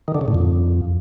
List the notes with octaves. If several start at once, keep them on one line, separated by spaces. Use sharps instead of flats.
D#3
D3
C#3
A2
F2